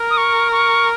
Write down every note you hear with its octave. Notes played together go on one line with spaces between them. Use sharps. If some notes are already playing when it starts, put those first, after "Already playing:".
Already playing: A#4
D#6
C#6
C#6